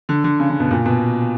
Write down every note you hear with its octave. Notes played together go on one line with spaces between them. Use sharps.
D3
D3
C#3
C#3
B2
A#2
B2